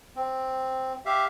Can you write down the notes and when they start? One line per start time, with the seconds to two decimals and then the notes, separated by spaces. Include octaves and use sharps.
0.16 C4
1.06 G4 E5 F5